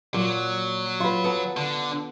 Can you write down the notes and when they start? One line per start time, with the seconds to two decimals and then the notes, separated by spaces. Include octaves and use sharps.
0.14 A#2 F#3
1.00 F4 B4
1.24 B3 A4
1.57 D3